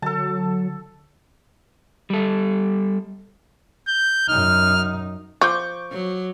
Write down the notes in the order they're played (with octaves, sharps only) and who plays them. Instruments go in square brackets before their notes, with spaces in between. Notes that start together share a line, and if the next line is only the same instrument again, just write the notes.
[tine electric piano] D3 [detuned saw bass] F#3 [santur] A4 A5
[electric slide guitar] G3 A4
[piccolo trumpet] G6
[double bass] F#2 D#4 [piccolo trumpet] F6
[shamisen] F3 [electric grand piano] C#6 D6 G6
[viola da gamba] F#3